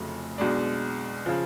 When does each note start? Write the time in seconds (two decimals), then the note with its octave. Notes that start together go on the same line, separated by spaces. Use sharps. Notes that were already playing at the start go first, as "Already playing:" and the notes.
Already playing: F1 F2 C#3 F#3 A3
0.38 B1 B2 G#3 D4
1.26 C#3 F3